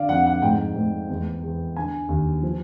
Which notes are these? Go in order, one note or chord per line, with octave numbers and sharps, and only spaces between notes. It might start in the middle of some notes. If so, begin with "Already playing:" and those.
Already playing: D3 D5 F5
F2 F#5
F#5
G#2 G5
G#2
E2
E2
D3 G#5
D#2
F3